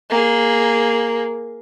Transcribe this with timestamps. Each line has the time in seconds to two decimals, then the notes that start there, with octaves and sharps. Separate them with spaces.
0.10 A#3 G#4